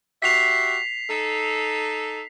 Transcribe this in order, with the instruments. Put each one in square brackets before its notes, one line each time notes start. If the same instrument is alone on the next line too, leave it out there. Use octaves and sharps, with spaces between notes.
[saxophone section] F#4 G4 E5 [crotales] B6 C7 F7
[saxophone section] D#4 A4